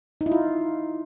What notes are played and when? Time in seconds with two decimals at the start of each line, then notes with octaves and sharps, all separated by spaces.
0.21 D#4
0.26 E4
0.32 F4